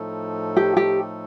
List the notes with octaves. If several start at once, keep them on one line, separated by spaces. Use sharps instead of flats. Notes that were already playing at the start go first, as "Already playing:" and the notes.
Already playing: A2 F3 A3 D#4 A4
G4
G4